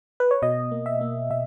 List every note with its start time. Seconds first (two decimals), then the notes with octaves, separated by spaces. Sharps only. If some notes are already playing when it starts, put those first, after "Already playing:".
0.20 B4
0.31 C#5
0.42 B2 D#5
0.71 A#3
0.86 E5
1.01 A#3
1.30 B2 E5